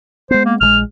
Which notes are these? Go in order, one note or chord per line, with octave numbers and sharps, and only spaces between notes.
G#3 B3 C5
A#3
A#1 F3 G#3 F6